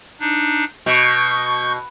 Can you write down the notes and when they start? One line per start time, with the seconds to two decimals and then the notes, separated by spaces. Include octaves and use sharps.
0.20 D4 D#4
0.86 B2 C#6 G6